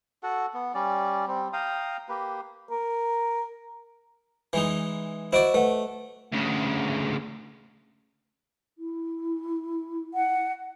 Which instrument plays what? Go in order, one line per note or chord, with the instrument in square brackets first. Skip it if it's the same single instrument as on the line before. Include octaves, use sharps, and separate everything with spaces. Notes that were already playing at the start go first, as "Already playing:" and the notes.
[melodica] F#4 A4 F#5
B3
G3 C#4 D5
G3 C4
F5 G5 A#5 D#6
A#3 G4 B4
[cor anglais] A#4
[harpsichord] E3 G#3 D#4
[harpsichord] E4 F#4 D5 [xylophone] C5 D#5 D7
[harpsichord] A3 [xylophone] B4 F#5
[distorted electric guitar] D2 C#3
[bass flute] E4
[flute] F#5